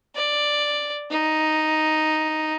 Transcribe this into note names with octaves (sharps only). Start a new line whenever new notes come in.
D5
D#4